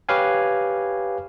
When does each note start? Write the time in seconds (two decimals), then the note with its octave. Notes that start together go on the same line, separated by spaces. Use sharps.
0.09 G4 B4 C#5 F5 G#5